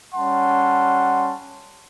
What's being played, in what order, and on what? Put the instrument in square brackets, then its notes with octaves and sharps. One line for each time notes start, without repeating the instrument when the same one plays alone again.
[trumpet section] G3 C#4 F#5 A5 C6